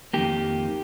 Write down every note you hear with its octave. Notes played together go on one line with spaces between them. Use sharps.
F2 D#3 A#3 G4